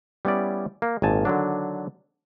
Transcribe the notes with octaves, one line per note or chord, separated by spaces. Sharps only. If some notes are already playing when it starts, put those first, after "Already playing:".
G3 B3 C#4 E4 D5
A#3
G#1 A#2 G#5 A5
D3 D#3 F#3 D4